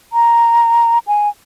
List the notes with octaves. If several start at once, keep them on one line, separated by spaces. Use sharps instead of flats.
A#5
G#5